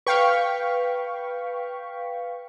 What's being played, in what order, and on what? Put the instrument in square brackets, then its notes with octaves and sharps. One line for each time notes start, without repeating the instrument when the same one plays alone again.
[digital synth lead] B4 [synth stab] F5 G5 C#6